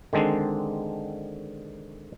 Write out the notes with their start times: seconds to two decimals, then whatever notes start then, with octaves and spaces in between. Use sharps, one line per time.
0.13 D3 D#3 G#3 C4 D4